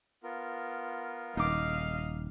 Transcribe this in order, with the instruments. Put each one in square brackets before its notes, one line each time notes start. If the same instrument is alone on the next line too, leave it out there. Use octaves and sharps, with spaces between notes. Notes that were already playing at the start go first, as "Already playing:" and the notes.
[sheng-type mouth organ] B3 F4 A#4
[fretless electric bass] D#1 [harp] D#4 D6 [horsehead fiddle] D#5 F5